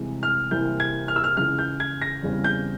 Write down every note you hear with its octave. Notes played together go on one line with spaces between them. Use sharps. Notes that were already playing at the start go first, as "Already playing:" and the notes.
Already playing: C2 C3 E3 G#3
F6
C2 C3 E3 A#3 G6
G#6
F6
E6
F6
C#2 C#3 E3 F6
G6
G#6
A#6
E2 C#3 G3 C4
G6